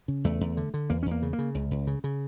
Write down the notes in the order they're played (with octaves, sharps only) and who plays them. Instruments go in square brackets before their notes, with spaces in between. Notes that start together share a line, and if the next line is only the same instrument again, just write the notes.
[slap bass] C#3
E2 A3
E2
D3
D3
E2 A#3
C#4
E2
A#3
C#3
A#3
C#3
C#2
C#2
C#3
C#3